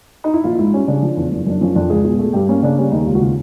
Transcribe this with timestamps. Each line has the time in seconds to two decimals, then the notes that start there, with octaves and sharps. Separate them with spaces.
0.24 D#4
0.34 E4
0.44 A#1 F4
0.59 G#2 E4
0.74 G3 C#4
0.88 C#3 D4
1.02 F3
1.17 E2
1.31 F#1
1.47 F#2 D4
1.61 F3 C#4
1.75 F2 D4
1.90 C#2 G#4
2.04 B2 G#4
2.19 A3 G#4
2.33 G2 G4
2.49 A#3 C#4
2.62 C#3 D4
2.77 G3 C#4
2.92 D#2 D#4
3.07 C#2 F4
3.15 F#4
3.21 C#3 F4